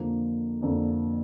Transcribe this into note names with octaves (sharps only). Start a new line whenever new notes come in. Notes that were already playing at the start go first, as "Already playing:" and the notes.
Already playing: F2 D3 F3 A#3
F2 D3 F3 A#3